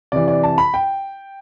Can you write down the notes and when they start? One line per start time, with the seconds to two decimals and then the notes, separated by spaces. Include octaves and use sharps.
0.12 C3 E3 D5
0.28 D5
0.43 A5
0.58 B5
0.74 G5